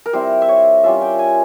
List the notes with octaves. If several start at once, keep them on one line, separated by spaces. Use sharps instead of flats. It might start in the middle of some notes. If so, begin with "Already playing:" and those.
A#4
G3 C4 E4 C5
E5
C#5
G3 C#4 F4 E5
G5
G#5